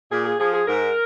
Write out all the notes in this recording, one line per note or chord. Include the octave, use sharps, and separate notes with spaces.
A#2 G#4
G#4
F3 G#4
G#4
G#2 A#4